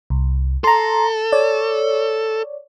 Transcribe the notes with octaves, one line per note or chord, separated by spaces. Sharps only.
C2
A4 A#5 C6
C#5 D5